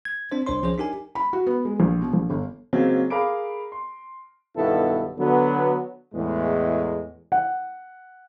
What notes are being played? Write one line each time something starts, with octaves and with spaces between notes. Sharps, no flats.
G#6
C4 D4 C5
C2 D4 C5 C#5 C6
F3 C#4 G#4 C5 C#5
D4 D#4 G4 A#4 G#5
B5
F#4
B3
G#3
A#1
B2
A#1
G1
C#3 F#3 G#3 A#3 C4 C#4
G#4 A#4 F5 B5 D6 D7
C6
B1 G2 D#3 B3 E4 A4
D3 F#3 B3
E2 A2 G#3
F#5